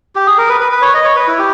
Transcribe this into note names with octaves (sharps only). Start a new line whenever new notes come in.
G4
G#4
A#4
B4
B4
B4
C#5
D#5
C#5
B4
E4
G4